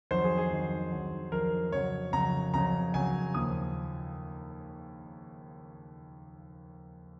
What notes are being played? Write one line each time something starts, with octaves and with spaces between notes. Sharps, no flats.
F2 D#3 F#3 C5
G#4
G#4
F2 D#3 F#3
F2 D#3 F#3
F2 D#3 F#3 A#4
F2 C#3 F#3 C#5
F2 C#3 F#3 A#5
F2 C#3 F#3 A#5
F2 C#3 F#3 G#5
D#2 C#3 F3 D#6